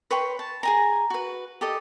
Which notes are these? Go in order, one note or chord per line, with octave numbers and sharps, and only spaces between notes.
B4 C#5 G5 C6
A5
G#4 G#5 A#5
F#4 B4
G4 A4 D#5